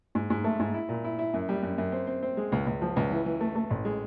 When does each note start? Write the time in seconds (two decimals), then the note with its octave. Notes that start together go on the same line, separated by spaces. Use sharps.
0.15 G#2
0.30 G#2
0.44 A3
0.60 G#2
0.74 E4
0.89 A#2
1.04 E4
1.19 E4
1.34 F#2
1.49 G3
1.63 F#2
1.78 F#2
1.92 C4
2.07 C4
2.23 C4
2.37 G#3
2.52 C#2
2.67 C#2
2.82 F3
2.96 C#2
3.11 E3
3.26 E3
3.41 A3
3.56 A3
3.70 A1
3.85 G#3